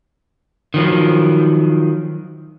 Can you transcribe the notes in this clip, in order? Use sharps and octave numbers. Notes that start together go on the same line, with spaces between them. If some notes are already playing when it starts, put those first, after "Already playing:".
D#3 F3 F#3